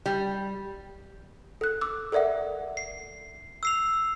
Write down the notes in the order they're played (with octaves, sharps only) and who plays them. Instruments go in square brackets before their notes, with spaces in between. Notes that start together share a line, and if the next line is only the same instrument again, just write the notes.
[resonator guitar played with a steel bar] G3
[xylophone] A4 F#6
D6 E6
A4 A#4 D5 E5 F#5
[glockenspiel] C7
E6 C7 F7